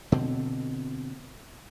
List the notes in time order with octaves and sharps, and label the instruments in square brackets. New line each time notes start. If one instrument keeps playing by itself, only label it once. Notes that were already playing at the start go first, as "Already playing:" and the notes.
[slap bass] B2 D3 C4